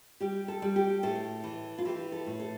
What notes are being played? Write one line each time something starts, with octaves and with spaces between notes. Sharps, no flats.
G3 G4
A4
G3
G4
A2 A4
E3
F4
E3 G4
A4
A2
A4